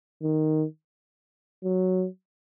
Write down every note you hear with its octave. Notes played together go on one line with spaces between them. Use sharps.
D#3
F#3